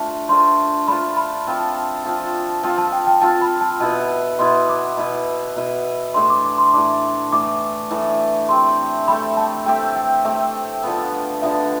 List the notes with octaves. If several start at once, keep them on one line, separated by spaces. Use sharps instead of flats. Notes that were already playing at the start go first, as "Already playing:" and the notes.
Already playing: A3 D4 F4 C5
A3 D4 F4 C5 C6
A3 D4 F4 C5 B5
B5
F3 C4 F4
F3 C4 F4
F3 C4 F4 A5
A5
G5
G5
F3 C4 F4 A5
B5
A5
B2 B3 E4 B4 A5
B2 B3 E4 B4 C6
D6
B2 B3 E4 B4
B2 B3 E4 B4
A2 E3 A3 D4 C6
D6
D6
C6
A2 E3 A3 D4 D6
A2 E3 A3 D4 D6
A2 E3 A3 D4
A3 C4 G4 C6
A3 C4 G4 B5
A5
A3 C4 G4 G5
G5
A3 C4 G4 E5
D3 F3 B3
D3 F3 B3 E5